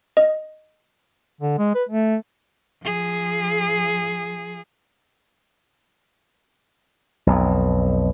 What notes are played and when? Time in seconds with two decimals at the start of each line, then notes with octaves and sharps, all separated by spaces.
0.17 D#5
1.41 D3
1.58 G#3
1.75 B4
1.89 A3
2.84 F3 G#4
7.27 B1 F2